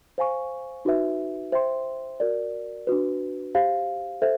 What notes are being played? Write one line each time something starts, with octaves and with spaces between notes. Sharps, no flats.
C5 F5 G#5 C#6
D#4 F#4 B4 E5
C5 E5 G5 C6
F#4 A#4 D5
D4 F#4 B4
G4 C5 F5
A4 C5 E5